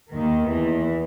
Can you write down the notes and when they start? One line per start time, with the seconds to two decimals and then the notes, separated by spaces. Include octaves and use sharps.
0.13 D#2 D#3
0.48 E2 E3